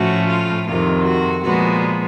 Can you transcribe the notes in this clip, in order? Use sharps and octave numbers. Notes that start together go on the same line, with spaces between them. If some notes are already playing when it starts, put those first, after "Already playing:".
Already playing: A2 F3 A3 C#4 F#4
F4
F2 C3 D#3 F4
F#4
A#2 F3 G#3 B3 F#4